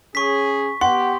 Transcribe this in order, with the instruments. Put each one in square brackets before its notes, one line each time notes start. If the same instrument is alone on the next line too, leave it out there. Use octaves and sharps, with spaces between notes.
[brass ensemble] C#4 G#4 [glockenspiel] C#6 B6
[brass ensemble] B3 G4 [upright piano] F#5 [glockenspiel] C6